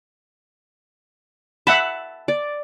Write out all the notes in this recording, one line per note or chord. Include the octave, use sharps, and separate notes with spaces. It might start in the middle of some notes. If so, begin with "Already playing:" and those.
E5 F#5 A5 B5
D5